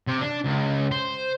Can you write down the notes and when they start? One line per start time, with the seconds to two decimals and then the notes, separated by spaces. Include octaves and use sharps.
0.07 C3
0.21 D4
0.44 C#2
0.92 C5